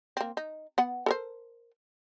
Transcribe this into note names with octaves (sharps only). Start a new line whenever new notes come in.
A#3 C4
D#4
B3 F#5
A4 A#4 C5